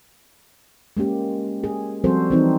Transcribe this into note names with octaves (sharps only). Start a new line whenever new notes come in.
G#3 A#3 C#4 G4
G#4
F3 G3 C4 F#4 A4 C5
E3 C4 D#4